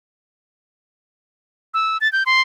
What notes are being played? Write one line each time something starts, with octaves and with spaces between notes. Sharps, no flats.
E6
A6
G6
C6